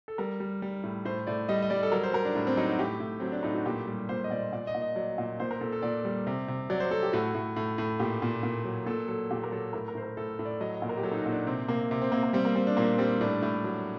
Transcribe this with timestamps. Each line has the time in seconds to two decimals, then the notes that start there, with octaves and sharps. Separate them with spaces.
0.08 A4
0.18 G3 A#4
0.40 G3
0.62 G3
0.83 A2
1.05 A2 C5
1.27 A2 D5
1.49 G3 D#5
1.62 D#5
1.70 G3 D5
1.83 A4
1.92 F#3 A#4
2.03 C5
2.13 F#3 A#4
2.25 D4
2.35 A2 D4
2.47 C4
2.57 F#3 D#4
2.69 F#4
2.79 A2 G4
3.00 A2
3.20 F#3 C4
3.32 D4
3.43 A2 D#4
3.54 F#4
3.66 A#2 G4
3.87 G3
4.09 A#2 C5
4.24 D#5
4.30 A#2 D5
4.53 A#2 D5
4.67 D#5
4.74 A#2
4.82 D#5
4.96 F#3 D5
5.18 A#2
5.40 A#2 C5
5.51 A#4
5.61 A#2 A4
5.72 A4
5.82 A#2 D5
6.05 G3
6.27 C3
6.48 C3
6.70 F#3 D5
6.80 C5
6.91 F#3 A4
7.03 G4
7.13 A2 F#4
7.35 A2
7.56 A2
7.78 A2
8.00 A#2 G4
8.22 A#2
8.43 A#2
8.65 F#3
8.86 A#2 A4
9.08 F#3 A4
9.31 A#2 G4
9.43 A#4
9.52 F#3 A4
9.73 A2 A#4
9.88 A#4
9.95 A2 C5
10.02 A#4
10.17 A2 A4
10.39 A2
10.45 D5
10.60 F#3 D#5
10.75 D#5
10.82 A#2
10.89 A#4
10.97 G4
11.03 F#3 A4
11.12 D#4
11.18 F#4
11.26 A#2
11.32 D4
11.47 C3 C4
11.68 C3 A#3
11.91 C3
12.02 C4
12.12 C3 A#3
12.23 A#3
12.33 G3 C4
12.45 A#3
12.55 G3 C4
12.67 D4
12.77 A#2 A#3
12.99 G3 C4
13.21 A2 D4
13.42 A2
13.64 F#3